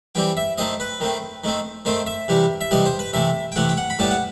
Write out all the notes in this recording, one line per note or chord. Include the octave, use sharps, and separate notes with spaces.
E3 G3 C4 G5
E5
D#3 A3 C4 D#5
B4
D#3 A3 C4
D#3 A3 C4
D#3 A3 C4 C5
E5
C3 E3 G3
E5
C3 E3 G3 D#5
C5
B4
C3 E3 A3 E5
G5
C3 E3 A3 F#5
G5
F#5
B5
A2 G3 B3 A5
F#5